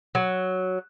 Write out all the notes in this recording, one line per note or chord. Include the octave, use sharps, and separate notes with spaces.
F#3